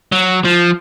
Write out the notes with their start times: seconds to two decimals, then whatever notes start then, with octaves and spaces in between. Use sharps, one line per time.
0.12 F#3
0.44 F3